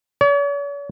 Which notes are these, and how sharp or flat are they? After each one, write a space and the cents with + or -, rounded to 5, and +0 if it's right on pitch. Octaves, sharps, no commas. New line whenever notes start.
C#5 +45